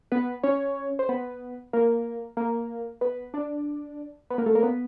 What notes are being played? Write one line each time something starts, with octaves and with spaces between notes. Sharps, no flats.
B3 B4
C#4 C#5
C5
B3 B4
A#3 A#4
A#3 A#4
B3 B4
D4 D5
B3 B4
A#3 A#4
A3 A4
A#3 A#4
B3 B4